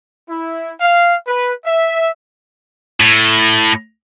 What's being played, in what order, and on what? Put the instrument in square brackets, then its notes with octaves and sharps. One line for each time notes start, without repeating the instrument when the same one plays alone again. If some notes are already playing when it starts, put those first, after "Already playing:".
[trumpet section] E4
F5
B4
E5
[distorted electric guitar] A2